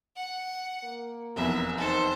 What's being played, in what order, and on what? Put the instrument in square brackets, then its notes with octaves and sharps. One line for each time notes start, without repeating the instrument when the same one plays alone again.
[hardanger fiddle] F#5
[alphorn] A#3
[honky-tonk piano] F1 B1 E2 [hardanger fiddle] E5
[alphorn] D#3 [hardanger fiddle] A4 C5